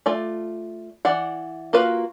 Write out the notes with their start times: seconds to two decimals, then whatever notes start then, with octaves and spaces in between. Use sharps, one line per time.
0.06 A3 F4 D5
1.05 E3 D5 F#5
1.73 A#3 F4 F#4 B4 F5